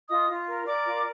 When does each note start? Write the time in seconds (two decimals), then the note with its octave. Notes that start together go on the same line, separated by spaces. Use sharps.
0.09 F4 D#5 D#6
0.29 F4
0.47 A#4
0.67 A#4 D5 D6
0.86 F4